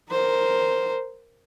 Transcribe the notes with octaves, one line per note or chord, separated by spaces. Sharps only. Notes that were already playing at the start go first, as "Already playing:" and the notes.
A#4 C5